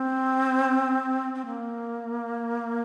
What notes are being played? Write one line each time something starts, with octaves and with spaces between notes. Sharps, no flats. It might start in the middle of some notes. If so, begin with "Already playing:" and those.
Already playing: C4
C4
A#3